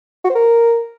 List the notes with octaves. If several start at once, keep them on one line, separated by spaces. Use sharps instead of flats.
F#4
C5
A#4